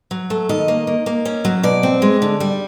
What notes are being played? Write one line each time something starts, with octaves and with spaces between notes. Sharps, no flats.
F#3
A3
D#3 D#5
A#3
A#3
A#3
C#4
F#3
B2 D5
C4
G#3
D3
G3